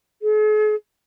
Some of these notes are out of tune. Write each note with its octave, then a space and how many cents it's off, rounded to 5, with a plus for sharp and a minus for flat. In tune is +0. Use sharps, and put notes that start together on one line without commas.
G#4 +45